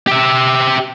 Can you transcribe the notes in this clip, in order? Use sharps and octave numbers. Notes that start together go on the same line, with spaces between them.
G4 E5